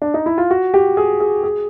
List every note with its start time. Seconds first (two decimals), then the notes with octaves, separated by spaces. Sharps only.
0.02 D4
0.14 D#4
0.26 E4
0.38 F4
0.51 F#4
0.74 G4
0.97 G#4
1.20 G#4
1.43 G#4